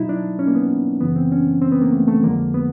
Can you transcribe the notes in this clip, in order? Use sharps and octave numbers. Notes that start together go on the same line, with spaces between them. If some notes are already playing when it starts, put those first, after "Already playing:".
Already playing: B2 F#3 D#4 E4
D4
C#4
A#3
B3
F#2 C#3 E3 B3
C4
C#4
C4
B3
A#3
A3
A3
F2 D3 F3 G#3 A#3
B3